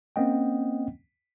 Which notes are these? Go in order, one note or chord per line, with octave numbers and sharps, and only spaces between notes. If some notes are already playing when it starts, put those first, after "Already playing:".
A#3 C4 C#4 D#5 F#5 G5